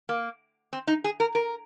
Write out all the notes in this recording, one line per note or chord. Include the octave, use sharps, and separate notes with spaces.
A#3
C4
D#4
G#4
A#4
A#4